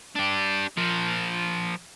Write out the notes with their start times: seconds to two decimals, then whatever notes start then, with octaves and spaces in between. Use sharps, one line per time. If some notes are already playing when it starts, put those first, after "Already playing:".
0.15 D4 G4
0.77 F3 A#4